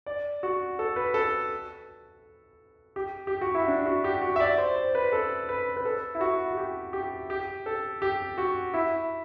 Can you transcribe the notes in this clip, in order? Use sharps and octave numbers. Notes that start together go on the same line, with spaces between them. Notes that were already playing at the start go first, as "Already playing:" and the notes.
D5
F#4
A4
B4
A4
G4
G4
F#4
E4
D4
F#4
G4
F#4
E5
D5
C5
C5
B4
A4
B4
B4
A4
E4
F#4
F#4
G4
G4
G4
A4
G4
F#4
E4